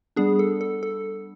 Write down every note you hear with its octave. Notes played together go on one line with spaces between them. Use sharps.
G3 B3 D4 G#4
A4
A4
A4